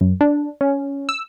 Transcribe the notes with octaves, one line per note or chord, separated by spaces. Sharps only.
F#2
D4
C#4
E6